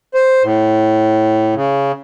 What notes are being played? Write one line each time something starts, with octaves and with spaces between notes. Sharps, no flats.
C5
A2
C#3